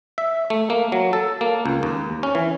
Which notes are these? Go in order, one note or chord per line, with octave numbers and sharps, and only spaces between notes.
E5
A3
A#3
F#3
A4
A#3
C#2
D#2
C#4
E3